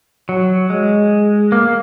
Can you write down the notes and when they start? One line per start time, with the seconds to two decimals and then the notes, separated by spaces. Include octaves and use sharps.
0.29 F#3
0.70 G#3
1.52 A#3